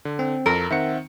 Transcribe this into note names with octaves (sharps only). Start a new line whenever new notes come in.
D3
C4
F2 A4 A#4
D#3 C4 E5 F#5 C#7